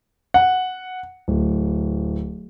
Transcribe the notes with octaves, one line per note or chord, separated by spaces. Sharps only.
F#5
D1